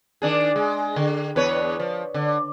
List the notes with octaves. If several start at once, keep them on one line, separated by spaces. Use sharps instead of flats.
D#3 D4 G#4
G#3
D3
E2 B4 C#5
F3
D3